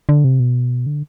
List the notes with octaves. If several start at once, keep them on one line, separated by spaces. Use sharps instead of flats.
D3
C3
B2
D3